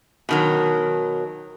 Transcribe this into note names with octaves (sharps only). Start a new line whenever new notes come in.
B2 D#3 F#3